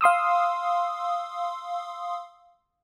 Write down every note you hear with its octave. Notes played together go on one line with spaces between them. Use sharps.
F5 C6 D#6 E6